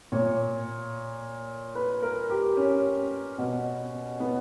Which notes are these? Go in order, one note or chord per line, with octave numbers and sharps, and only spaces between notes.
A#2 C#5
B4
A#4
G4
C#4
B2
B3